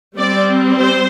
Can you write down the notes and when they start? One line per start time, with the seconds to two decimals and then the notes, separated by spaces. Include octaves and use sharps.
0.17 G3 C4 D5
0.79 C5